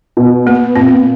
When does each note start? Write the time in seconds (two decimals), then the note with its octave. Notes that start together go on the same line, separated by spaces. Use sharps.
0.17 B2
0.46 A#3 B3
0.76 A#2 C4